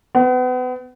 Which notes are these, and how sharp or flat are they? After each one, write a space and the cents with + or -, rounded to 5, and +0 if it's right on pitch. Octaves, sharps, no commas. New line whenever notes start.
B3 +35